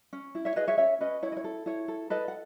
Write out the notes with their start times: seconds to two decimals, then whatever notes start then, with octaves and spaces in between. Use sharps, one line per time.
0.13 C#4
0.35 E4
0.45 C#5 E5
0.56 G#4 B4 D#5
0.68 C#5 E5
0.78 C#4 C#5 E5
1.01 C#4 B4 D#5
1.22 E4 C#5
1.32 D#5
1.37 C#5
1.44 A4
1.66 E4 C#5
1.88 A4
2.10 A4 B4 D#5
2.28 F#5